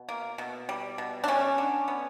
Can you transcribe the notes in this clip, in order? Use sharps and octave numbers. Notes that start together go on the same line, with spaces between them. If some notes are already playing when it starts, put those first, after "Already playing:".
Already playing: B2
A#3
B2
G3
B2
D4
G3 C#4
D3
B3